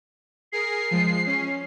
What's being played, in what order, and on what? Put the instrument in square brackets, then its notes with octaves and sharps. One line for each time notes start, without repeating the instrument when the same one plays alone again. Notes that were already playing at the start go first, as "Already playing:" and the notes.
[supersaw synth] G#4 A#4 [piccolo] C7
[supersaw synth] F3 G#3
C#4